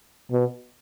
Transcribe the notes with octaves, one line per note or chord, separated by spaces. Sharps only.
B2